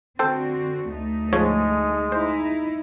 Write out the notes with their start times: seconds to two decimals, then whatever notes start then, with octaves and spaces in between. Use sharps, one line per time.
0.19 D3 C4 F#4 A4 C5 G5
0.92 D2 A3 D#4
1.33 G#2 F3 G#3 C#5
2.12 D#4 E4 C5